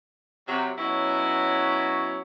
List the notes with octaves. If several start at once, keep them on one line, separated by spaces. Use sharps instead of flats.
C3 F#3
B2 F#3 C#4 E4 F#4 C#5